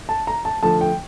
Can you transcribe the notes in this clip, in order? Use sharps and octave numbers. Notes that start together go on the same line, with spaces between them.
A5
A#5
A5
D3 F3 A3 A5
G5